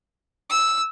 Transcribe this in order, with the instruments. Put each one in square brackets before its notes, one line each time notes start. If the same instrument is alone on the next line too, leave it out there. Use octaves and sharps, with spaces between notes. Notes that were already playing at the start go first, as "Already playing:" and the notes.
[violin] E6